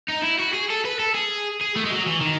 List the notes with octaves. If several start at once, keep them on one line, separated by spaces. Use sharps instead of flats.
D#4
E4
F#4
G#4
A4
B4
A4
G#4
G#4
A3
G#3
F#3
E3
D#3